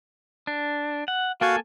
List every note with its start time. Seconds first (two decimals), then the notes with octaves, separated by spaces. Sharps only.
0.47 D4
1.08 F#5
1.41 A#3 F#4 A4 F5 F#5 G#5